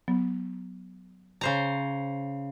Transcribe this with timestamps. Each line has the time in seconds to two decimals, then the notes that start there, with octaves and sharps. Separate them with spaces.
0.08 F#3 B3
1.41 C#3 C5 A#5